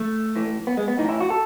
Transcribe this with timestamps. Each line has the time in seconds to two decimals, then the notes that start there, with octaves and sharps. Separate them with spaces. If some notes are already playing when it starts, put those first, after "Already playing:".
Already playing: A3
0.36 A2 E3
0.67 B3
0.77 G#3
0.88 B3
0.98 A2 E3 D#4
1.09 E4
1.20 F#4
1.30 A4